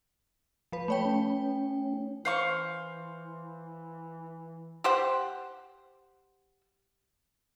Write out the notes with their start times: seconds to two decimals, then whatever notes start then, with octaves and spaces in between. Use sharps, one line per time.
0.72 F3 B4
0.88 A3 C#5 G5 B5
1.05 C#4
2.25 E3 C5 F5 C#6
4.84 G4 C5 F#5